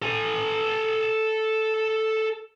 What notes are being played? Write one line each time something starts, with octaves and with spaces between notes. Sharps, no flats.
A4 G#5